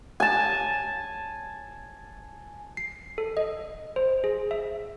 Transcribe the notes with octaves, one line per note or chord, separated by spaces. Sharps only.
G#5 A5
C7
A4
D#5
C5
G#4
E5